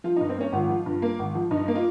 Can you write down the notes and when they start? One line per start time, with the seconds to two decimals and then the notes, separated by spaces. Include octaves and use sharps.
0.04 F3 F4
0.16 G2 D#4
0.29 C4
0.37 A#3 C#4
0.53 G#1 F4
0.70 F3
0.86 G2
1.02 A#3
1.19 G#1
1.35 F3
1.51 G2 D#4
1.68 A#3
1.76 F4